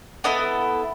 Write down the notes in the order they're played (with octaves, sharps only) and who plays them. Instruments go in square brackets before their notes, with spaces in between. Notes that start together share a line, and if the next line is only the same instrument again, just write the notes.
[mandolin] B3 E4 A4 D#5